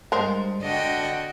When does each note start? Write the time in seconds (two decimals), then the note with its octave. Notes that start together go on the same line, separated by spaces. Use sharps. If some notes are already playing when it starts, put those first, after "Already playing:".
0.12 G2 G#3 A#4 C5
0.62 D3 F#4 D#5 G5